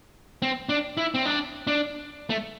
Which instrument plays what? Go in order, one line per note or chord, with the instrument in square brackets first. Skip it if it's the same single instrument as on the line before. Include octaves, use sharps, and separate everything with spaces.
[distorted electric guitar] C4
D4
E4
C4
D4
D4
A3